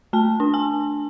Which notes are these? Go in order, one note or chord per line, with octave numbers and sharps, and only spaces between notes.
A3 A5
D4
G#5